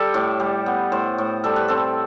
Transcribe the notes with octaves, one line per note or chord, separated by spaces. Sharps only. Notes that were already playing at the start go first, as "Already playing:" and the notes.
Already playing: G3 G4 A4
A2
G3
B3
A2 C5
A2
G3 A4
B4
C4 A4